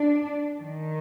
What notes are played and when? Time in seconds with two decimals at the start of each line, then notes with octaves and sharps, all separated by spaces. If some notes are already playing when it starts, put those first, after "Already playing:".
Already playing: D4
0.59 D#3